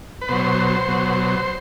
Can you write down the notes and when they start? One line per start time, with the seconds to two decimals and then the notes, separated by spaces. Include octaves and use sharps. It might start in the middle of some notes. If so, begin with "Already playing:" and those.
0.21 B4
0.29 B2 F#3 C5
0.88 B2 F#3